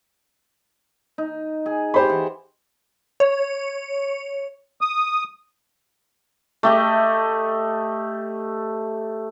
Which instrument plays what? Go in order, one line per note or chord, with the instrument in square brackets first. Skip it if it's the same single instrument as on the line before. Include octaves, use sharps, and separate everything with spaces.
[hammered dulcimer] D#4
G#4
[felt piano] G4 C5 B5
[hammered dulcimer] E3 F#5
[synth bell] C#5
[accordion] D#6
[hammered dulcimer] A3 G4 D#5